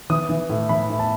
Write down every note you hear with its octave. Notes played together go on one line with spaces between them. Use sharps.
E3 D#6
E3
A2
E3 B5
A2
A5